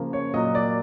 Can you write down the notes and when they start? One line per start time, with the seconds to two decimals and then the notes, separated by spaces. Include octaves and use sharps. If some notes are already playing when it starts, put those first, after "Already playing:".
Already playing: C#3 F3 A#3
0.13 C#5
0.34 A#2 F#3 A#3 D#5
0.55 D5